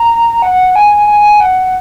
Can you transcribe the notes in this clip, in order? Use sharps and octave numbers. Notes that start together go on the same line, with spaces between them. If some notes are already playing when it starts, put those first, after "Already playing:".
Already playing: A#5
F#5
G#5
G#5
F#5